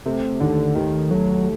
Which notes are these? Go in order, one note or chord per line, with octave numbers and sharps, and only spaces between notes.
C3 A3
D#2 D3
D#2 D#3
F#3 A3